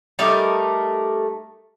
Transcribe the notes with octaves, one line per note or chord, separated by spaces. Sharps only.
G3 A3 D#4 A#4